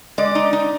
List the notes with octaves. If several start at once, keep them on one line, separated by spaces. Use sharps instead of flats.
G#3 D5
D#4
D#4